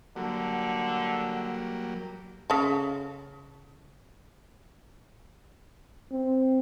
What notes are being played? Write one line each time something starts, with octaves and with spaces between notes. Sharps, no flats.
D3 F#3 G3 A#3
C#3 A4
C4